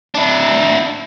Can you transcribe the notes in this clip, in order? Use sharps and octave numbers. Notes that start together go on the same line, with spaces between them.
D4 E4